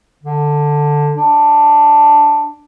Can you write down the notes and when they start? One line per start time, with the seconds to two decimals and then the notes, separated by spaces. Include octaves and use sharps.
0.23 D3
1.16 D4